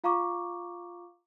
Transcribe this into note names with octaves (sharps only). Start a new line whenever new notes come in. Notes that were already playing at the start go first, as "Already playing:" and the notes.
F4 F5 A#5 C#6 D6